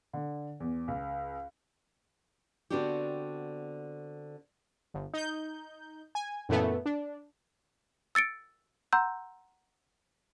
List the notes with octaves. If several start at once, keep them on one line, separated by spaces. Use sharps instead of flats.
D3
E2
C#2
D3 B3 C4 D4 F#4 G4
G1
D#4 G6
G#5
F#2 A#2 E3 A3 B3
D4
E6 A6 C#7 D7
F#5 A#5 C6 E6 G6